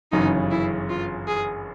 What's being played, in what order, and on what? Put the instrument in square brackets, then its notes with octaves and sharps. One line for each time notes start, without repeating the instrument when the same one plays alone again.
[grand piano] G1 F#2 C#3 E3 [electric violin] D#4
[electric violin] E4
F4
G#4